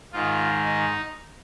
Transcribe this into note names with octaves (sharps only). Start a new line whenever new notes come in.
G#2 D#3 F4
D#4